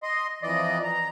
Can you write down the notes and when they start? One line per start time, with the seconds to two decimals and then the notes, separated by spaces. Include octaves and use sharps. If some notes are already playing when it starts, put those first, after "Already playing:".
0.03 D#5 C6
0.43 F2 E3 D5 D#5
0.84 A#5